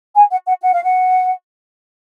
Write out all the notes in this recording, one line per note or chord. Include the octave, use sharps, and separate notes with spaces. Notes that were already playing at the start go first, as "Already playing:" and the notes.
G#5
F#5
F#5
F#5
F5
F#5